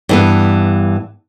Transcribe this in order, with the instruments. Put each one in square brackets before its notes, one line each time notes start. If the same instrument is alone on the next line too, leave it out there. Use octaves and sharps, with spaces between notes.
[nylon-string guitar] G2 E3 B3